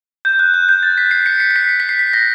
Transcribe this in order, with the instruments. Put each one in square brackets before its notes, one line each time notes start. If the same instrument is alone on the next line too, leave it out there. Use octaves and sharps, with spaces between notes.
[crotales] G6
F#6
F#6
G6
A6
B6
C7
B6 C#7
C7
C7
B6 C#7
C7
B6
C7
B6
A#6